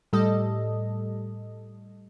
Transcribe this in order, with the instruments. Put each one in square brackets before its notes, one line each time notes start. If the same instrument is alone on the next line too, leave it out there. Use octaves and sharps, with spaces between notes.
[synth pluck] A2 G3 A4 D#5